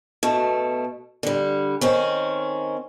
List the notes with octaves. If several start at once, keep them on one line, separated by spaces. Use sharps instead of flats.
B2 A3
D3 G3
D#3 C4 C#4